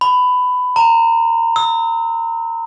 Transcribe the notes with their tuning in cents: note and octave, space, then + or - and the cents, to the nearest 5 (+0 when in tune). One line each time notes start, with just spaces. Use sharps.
B5 +15
A#5 -25
E6 -40